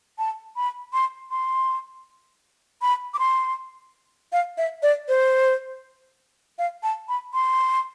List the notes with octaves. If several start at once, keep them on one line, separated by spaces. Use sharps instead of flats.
A5
B5
C6
C6
B5
D6
C6
F5
E5
D5
C5
F5
A5
B5
C6